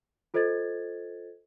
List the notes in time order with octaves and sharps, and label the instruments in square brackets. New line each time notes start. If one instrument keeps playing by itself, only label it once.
[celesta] F4 A4 C5 D#5 G#6 A6